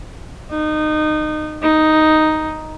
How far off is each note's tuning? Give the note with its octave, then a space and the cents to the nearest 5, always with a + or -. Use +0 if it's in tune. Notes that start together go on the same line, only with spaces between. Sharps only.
D#4 -25
D#4 +0